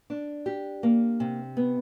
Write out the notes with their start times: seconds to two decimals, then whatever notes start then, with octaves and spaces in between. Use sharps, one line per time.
0.10 D4
0.46 G4
0.83 A#3
1.20 C3
1.57 B3